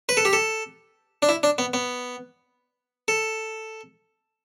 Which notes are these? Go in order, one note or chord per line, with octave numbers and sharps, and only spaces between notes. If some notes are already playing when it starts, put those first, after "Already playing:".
B4
A4
G4
A4
D4
E4
D4
B3
B3
A4